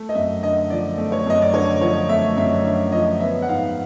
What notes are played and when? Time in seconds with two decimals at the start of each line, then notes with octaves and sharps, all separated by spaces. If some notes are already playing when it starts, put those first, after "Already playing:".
Already playing: A3
0.09 D#5
0.15 F#2 E5
0.43 D3 D#5
0.70 F3 D5
0.98 A3
1.12 C#5
1.26 F#2 D#5
1.42 D5
1.53 D3 C#5
1.81 F3 C#5
2.09 A3 E5
2.37 F#2 E5
2.64 D3 E5
2.92 F3 D#5
3.20 B3 E5
3.42 F#5
3.48 G#2 F5